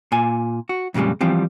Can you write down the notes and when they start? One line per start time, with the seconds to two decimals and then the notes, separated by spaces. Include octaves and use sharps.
0.12 A#2 G#5
0.69 F#4
0.94 F2 A#2 C#3 G3 G#3
1.21 E3 F3 G3 C4